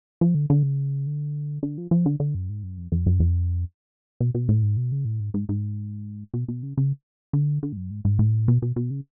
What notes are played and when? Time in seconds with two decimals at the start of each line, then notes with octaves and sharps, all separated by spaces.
0.21 F3
0.35 D3
0.50 D3
0.63 C#3
1.07 D3
1.63 D3
1.78 F3
1.91 F3
2.06 D3
2.20 D3
2.35 F#2
2.50 G#2
2.63 F#2
2.78 F2
2.92 F2
3.06 F#2
3.20 F2
4.20 B2
4.35 B2
4.49 A2
4.63 G#2
4.77 B2
4.92 C#3
5.05 A2
5.20 G#2
5.34 G#2
5.49 G#2
6.34 B2
6.48 B2
6.63 C#3
6.77 C#3
7.33 D3
7.63 D3
7.73 G#2
7.77 F#2
7.91 G#2
8.05 G#2
8.19 A2
8.48 B2
8.62 B2
8.76 B2
8.90 C#3